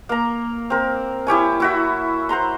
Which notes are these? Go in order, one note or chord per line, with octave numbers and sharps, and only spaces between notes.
A#3 A#5
C4 A#4
E4 G4 C#5 G#5
E4 F#4 E5
C5 F#5 A#5 C6